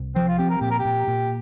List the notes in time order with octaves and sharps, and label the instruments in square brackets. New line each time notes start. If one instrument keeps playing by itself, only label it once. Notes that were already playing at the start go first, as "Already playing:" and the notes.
Already playing: [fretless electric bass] C2
[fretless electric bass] F3 [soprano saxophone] C4
[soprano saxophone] F4
[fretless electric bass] C4 [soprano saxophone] G4
[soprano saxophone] A#4
[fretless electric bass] A#2 [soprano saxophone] G4
[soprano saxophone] A#4
G4
[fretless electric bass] A#2
A#2